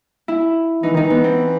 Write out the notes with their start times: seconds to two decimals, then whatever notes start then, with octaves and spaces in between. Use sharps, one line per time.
0.28 E4
0.83 E3 D#4
0.93 D#3 D#4
1.02 E3
1.10 B3
1.24 C4